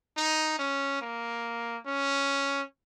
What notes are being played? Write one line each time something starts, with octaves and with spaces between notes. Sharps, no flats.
D#4
C#4
A#3
C#4